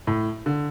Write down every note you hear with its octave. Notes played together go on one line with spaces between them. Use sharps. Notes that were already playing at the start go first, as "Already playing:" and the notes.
A2
D3